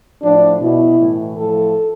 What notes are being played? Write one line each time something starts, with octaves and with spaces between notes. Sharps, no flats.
A2 F3 D4
B2 E4
A2 E3
A2 F3 A4